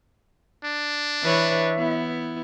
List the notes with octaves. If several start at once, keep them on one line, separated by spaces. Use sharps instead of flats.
D4
E3 B4 C#5 E5
B3 E4